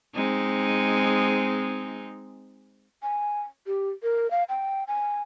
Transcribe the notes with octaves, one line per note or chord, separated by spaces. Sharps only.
G#3 C4 D#4
G#5
G4
A#4
F5
G5
G#5